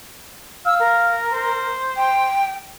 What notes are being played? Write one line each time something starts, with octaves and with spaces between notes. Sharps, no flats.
F5 E6
A#4
C5
G5